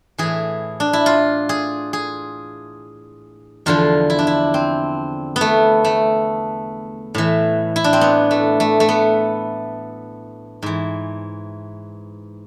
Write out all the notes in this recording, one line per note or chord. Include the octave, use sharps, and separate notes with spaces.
A2 E3 G#4
D4
E4
F4
G#4
G#4
E2 D3 F3 F4
E4
D4
E4
C4
B3
A3
A3
A2 E3
E4
D4
C4
B3
A3
A3
A3
B3
G#2 E3